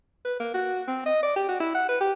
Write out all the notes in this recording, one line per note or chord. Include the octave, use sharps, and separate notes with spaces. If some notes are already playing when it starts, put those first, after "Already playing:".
B4
A#3
F#4
C4
D#5
D5
G4
F#4
E4
F#5
B4
G4